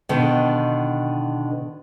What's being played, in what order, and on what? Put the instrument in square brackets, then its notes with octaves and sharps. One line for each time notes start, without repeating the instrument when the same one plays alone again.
[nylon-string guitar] B2 D3 D#3 B3